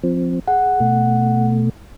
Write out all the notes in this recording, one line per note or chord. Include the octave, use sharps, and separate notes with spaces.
F3 C4
G#4 F#5
B2 A3